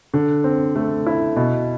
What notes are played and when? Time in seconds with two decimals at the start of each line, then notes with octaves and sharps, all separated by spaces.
0.14 D3
0.44 C4
0.76 A3
1.07 E4
1.36 B2